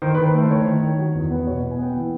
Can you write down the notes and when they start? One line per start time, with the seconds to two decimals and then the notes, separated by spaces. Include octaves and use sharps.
0.02 D#3 C5
0.15 B4
0.18 D#3
0.26 B4
0.34 A3 C5
0.51 D#3 C#5
0.66 D#3
0.82 D#3
0.99 F#3
1.14 E2
1.31 B3
1.47 B2 C#5
1.63 B3
1.71 G#5
1.79 B3 G5
1.96 E3